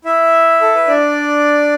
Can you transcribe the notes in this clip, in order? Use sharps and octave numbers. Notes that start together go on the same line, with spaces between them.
E4 E5
A4
B4
D4 D5